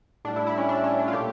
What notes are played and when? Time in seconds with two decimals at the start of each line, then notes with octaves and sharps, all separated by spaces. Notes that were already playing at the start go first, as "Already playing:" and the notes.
0.25 A2 G3 D4
0.36 E4
0.47 E4
0.58 C#4
0.69 D4
0.84 C#4
0.99 D4
1.08 F4
1.13 A#2 A3 G4